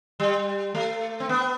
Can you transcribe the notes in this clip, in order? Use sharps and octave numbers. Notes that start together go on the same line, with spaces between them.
G3
A3
C4
B3